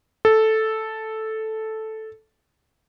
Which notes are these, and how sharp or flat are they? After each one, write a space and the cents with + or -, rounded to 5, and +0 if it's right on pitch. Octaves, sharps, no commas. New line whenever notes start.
A4 -5